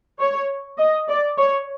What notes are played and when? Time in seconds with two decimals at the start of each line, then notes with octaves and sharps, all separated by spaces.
0.19 C#5
0.78 D#5
1.08 D5
1.38 C#5